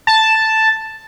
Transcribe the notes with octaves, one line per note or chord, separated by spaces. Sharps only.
A5